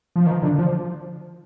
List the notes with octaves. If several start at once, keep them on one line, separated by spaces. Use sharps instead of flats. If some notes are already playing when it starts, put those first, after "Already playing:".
F3
D#3
D3
F3